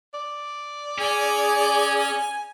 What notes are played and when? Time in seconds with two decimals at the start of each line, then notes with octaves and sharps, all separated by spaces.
0.14 D5
0.99 C#4 G#4 G#5